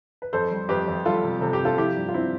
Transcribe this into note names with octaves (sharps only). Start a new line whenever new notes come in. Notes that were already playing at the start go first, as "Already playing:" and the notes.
B4
F2 A4 C5
G3
F2 G4 B4
F2
G3 F4 A4
C3
C3 A4
G4
C3
F4 A4
F3 E4 G4
G2
F4
F3 C4 E4